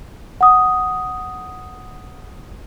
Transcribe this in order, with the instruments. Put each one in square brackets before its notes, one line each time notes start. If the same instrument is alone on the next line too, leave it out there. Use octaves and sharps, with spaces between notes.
[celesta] F#5 D#6